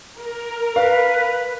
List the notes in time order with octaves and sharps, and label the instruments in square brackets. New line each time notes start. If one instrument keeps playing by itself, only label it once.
[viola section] A#4
[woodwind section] B4 [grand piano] F5